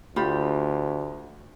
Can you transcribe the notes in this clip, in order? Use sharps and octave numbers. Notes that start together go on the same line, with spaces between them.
D2 F4 G4 B5